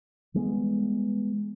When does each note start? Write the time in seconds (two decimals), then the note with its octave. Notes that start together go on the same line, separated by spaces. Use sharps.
0.34 E3 G3 G#3 B3